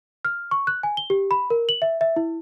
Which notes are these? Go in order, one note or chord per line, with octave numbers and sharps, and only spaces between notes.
F6
C#6
F#6
G#5
G7
G4
B5
A#4
F#7
E5
E5
E4